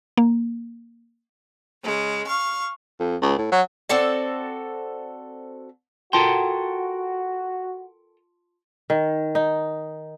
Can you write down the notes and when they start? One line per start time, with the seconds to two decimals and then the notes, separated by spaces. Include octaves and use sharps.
0.17 A#3
1.83 C#3 G#3
2.26 F5 C#6
3.00 F2
3.22 C#2
3.38 A2
3.52 F#3
3.89 C4 F#4 A4 D5
6.13 F4 F#4 A4 A#4 G5 A5 C6
8.90 D#3
9.35 D#4